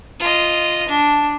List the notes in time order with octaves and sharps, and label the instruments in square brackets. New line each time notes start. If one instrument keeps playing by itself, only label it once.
[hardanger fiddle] F4 D#5
D4